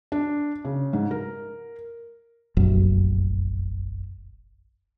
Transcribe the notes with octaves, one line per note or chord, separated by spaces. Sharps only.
D4
C#3
G#2
A#4
F1 A#1 F#2